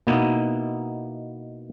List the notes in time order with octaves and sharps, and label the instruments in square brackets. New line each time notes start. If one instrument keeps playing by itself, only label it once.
[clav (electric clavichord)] B2 A#3 B3 D#4 E4